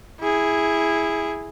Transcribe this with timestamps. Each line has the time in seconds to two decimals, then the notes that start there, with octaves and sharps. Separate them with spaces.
0.20 E4 G#4